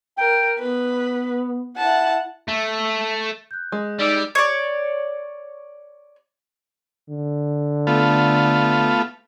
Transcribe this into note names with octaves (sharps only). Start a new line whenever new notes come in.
A#4 G5
B3 B4
E4 F#5 A5
A3
F#6 G6
G#3
G3 D#4 D5 E6 B6
C#5 D5
D3
A3 B3 F4